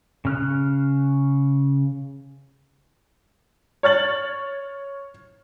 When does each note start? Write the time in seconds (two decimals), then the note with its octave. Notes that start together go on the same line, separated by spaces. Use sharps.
0.25 C#3 F6 F#6
3.83 C#5 F6 A6 F#7